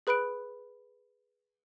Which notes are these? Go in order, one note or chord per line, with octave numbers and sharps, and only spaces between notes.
G#4 B4 B5 F#6 D7